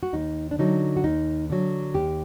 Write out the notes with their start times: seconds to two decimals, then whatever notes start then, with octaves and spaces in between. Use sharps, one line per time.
0.03 F#4
0.13 D#2 D#4
0.51 D4
0.59 D3 F#3 D#4
0.97 F#4
1.04 D#2 D#4
1.50 D3 F#3
1.94 D#2 G4